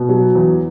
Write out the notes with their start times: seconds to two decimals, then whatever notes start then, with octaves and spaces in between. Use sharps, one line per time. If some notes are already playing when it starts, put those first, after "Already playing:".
Already playing: B2
0.09 F#3
0.35 E2